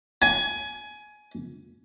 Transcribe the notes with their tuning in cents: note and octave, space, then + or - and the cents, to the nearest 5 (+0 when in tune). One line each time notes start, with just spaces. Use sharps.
G#5 +20